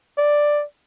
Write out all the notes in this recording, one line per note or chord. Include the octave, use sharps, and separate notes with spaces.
D5